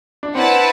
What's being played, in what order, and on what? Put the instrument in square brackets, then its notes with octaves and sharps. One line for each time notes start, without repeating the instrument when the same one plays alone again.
[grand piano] D4
[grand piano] C4 [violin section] E4 B4 F#5 A5